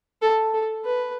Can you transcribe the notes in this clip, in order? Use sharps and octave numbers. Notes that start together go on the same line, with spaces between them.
A4
A4
B4